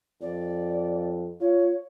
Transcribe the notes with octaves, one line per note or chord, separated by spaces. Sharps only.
F2 D5
F4 C#5